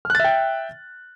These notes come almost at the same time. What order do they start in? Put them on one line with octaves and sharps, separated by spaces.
F6 F#6 A6 E5 G5